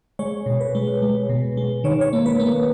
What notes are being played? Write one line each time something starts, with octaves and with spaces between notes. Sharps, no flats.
G#3 C#5
B2
B4
G#3
G#3
B2
G#3
D#3 C#5
C#5
A#3
B4
A#3